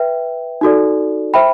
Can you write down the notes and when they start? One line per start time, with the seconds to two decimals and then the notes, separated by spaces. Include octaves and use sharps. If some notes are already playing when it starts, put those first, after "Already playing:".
Already playing: B4 E5 G5
0.61 D#4 F#4 A4 D5
1.34 C5 E5 G5 B5